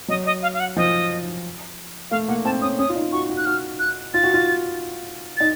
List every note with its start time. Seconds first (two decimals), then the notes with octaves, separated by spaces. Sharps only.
0.08 F#3 D#5
0.26 D#5
0.42 F5
0.54 F5
0.60 F#5
0.76 F3 D#5
2.11 A3 F5
2.28 A#3 F#5
2.45 C4 A5
2.62 C#4 D#6
2.78 C#4 D#6
2.89 F4
2.96 D#4
3.12 F#4 C#6
3.29 F#4
3.37 F#6
3.46 F#4 F6
3.79 F#6
4.14 F4 A6
4.23 F#4
4.34 F4
5.37 D#4 A6